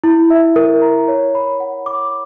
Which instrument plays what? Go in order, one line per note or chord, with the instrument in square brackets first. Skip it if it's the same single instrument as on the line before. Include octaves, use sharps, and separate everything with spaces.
[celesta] E4
E5
A#4
A#5
C#5
B5
F#5
D6